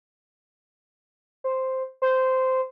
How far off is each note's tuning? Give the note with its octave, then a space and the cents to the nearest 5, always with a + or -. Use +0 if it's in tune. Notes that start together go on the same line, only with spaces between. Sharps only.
C5 +0
C5 -10